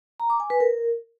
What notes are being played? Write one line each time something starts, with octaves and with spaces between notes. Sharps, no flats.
A#5
D6
G#5
B4
A#4